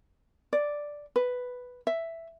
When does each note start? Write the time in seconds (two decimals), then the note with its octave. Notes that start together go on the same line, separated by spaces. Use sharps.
0.53 D5
1.16 B4
1.87 E5